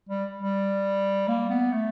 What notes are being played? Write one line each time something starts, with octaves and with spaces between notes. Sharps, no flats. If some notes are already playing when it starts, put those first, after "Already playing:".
G3
G3
A#3
B3
A3